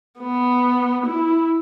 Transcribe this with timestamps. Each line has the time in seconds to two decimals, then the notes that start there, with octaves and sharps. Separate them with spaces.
0.20 B3
1.06 E4